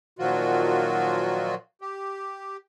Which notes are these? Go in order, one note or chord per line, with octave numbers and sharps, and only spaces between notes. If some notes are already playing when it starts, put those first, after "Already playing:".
A#2 D#3 F3 F#3 F4 F#4
G4